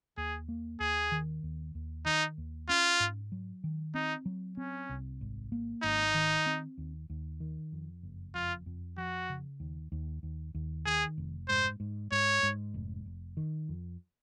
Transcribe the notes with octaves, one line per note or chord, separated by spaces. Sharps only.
D#2 G#4
A#3
D#2 G#4
D#3
D#2
D#2
D#3 D#4
D#2
C#4 F4
G#2
F#3
D#3
C4 D#4
F#3
C4 C#4
C2
G#1
A#3
G#1 D#4
D#3
C4
D#2
D#2
D#3
F2
F#1
F2 F4
F2
F3 F#4
C#3
D#2
D#2
D#2
D#2
D#3 G#4
F1
G#2 C5
G#2
G#2 C#5
G#2
F1
F1
D#3
F2